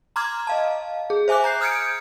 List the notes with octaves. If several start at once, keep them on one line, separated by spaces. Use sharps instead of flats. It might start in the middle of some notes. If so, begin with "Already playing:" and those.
A#5 C6 D6 F6 G#6
D#5 F5 A5
G#4
C5 E5 G#5 D6 F#6
A#5 G6 C7
D#6 F6 G6 G#6 C#7 D7